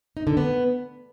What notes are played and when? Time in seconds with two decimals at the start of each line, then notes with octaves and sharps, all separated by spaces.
0.17 D#4
0.27 D3
0.37 B3